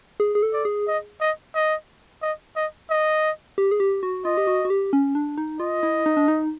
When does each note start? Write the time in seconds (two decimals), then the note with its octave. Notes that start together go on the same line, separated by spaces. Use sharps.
0.20 G#4
0.35 G#4
0.43 A4
0.53 D5
0.65 G#4
0.88 D#5
1.21 D#5
1.55 D#5
2.22 D#5
2.56 D#5
2.90 D#5
3.58 G4
3.71 G#4
3.80 G4
4.03 F#4
4.25 F4 D#5
4.37 G4
4.47 F#4
4.65 F#4
4.70 G4
4.93 C#4
5.15 D4
5.38 D#4
5.60 F4 D#5
5.83 E4
6.06 D#4
6.17 D4
6.28 D#4